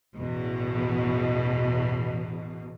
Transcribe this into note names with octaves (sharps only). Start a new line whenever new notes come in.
A1 E2 B2